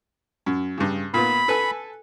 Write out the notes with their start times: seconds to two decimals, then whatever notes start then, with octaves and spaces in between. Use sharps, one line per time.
0.46 F#2
0.78 G2 C#3
1.14 A#2 B3 B5
1.48 A4 B4 G#5